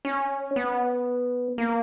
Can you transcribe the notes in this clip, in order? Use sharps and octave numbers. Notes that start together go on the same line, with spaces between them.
C#4
B3
A#3